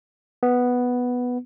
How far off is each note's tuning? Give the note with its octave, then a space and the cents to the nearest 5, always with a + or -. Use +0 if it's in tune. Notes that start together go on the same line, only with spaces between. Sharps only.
B3 +0